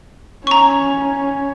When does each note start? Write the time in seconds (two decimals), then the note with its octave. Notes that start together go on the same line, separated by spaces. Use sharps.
0.47 C#4 A#5 C#6